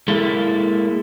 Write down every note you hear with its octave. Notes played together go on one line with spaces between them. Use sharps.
G#3 A#3 E4 A4